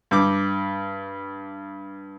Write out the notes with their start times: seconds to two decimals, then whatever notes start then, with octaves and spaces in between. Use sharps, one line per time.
0.11 G2 D6